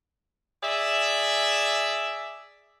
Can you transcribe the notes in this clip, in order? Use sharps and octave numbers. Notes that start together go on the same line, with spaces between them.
G#4 D5 E5